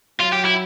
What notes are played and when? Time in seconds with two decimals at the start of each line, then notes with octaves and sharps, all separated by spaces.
0.20 F#3 F4
0.33 G4
0.45 E4